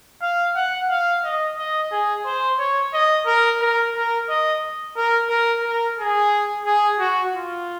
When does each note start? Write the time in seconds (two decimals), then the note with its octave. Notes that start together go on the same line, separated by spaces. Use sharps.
0.22 F5
0.56 F#5
0.89 F5
1.24 D#5
1.58 D#5
1.92 G#4
2.26 C5
2.59 C#5
2.94 D#5
3.26 A#4
3.61 A#4
3.95 A#4
4.29 D#5
4.97 A#4
5.30 A#4
5.64 A#4
5.99 G#4
6.65 G#4
7.00 F#4
7.34 F4